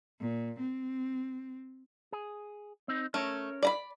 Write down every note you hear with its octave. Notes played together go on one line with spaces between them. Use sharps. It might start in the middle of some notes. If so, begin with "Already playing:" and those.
A#2
C4
G#4
C4 D#4
A3 C#4 A#4 C#5
D5 A#5 B5